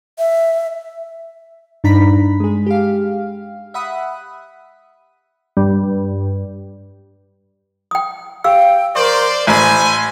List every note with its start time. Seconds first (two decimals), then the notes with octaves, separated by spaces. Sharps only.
0.19 E5
1.84 G2 D4 D#4 A#5 B5 B6
2.40 G#3 G#4
2.66 G4 F5
3.74 E5 F#5 B5 D#6
5.57 G2
7.91 G5 D#6
8.44 G4 F5 G5 E6
8.96 A#4 C5 D5 C6 C#6
9.47 A1 C5 G#5 B5 E6